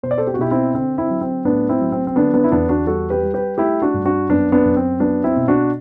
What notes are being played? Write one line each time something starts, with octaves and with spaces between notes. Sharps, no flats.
B2 C5
D5
A4 C5
G4
F#4
B2 E4 G4
C4 E4
D3 C4
C4 E4
F#3
C4
A2 B3 D4
C4 E4
F#3
C4
C4
D3 B3 D4
B3 D4
E4
E2 B3 D4
D4 F#4
G3 F#4 A4
G4 B4
G3
G4 B4
A3 E4 G4
D4 F#4
G2
D4 F#4
F#2 B3 D4
B3 D4
F#2
C4
F#3 B3 D4
C4 E4
B2
D4 F#4